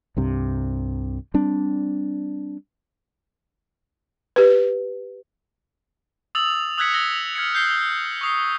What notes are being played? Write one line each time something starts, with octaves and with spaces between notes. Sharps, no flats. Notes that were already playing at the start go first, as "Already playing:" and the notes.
C2 G2 C3
G3 C4 D4
G4 B4
D#6 E6 A6 F7 F#7
D#6 E6 F#6 G#6 B6 C#7
E6 A#6 B6 F7 G7
F6 G#6 B6 C#7
G6 C7 G7
C#6 D#6 C7